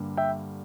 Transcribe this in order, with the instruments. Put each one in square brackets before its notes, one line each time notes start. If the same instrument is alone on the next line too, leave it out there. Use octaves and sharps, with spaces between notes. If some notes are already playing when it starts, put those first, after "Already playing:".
Already playing: [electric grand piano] G2 D3 G3 A#3
E5 G5